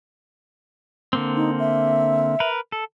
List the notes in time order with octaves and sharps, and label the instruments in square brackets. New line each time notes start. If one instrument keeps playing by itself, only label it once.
[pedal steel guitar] D3 A#3 C4
[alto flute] D#4
E5
[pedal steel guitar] A#4 B4
A4